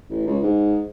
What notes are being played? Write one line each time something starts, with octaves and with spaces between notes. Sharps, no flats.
A1
C#2
G#2